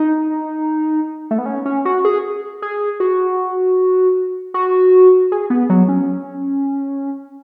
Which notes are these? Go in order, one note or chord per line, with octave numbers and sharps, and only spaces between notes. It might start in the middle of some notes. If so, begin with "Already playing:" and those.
Already playing: D#4
A3
B3
C#4
C#4
F#4
G#4
G#4
F#4
F#4
G#4
B3
F#3
C#4